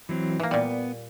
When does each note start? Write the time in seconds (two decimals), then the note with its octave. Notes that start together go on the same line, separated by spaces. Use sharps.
0.09 E3 F#3 C4
0.39 E3 A#3
0.51 A#2 G3 B3